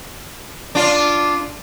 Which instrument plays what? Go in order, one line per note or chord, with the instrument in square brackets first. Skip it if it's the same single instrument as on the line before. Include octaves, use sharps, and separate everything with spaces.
[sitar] D4 F4